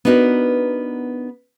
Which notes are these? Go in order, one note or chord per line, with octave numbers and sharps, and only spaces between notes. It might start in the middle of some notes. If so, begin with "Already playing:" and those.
B3 D4 D#4 F#4 A#4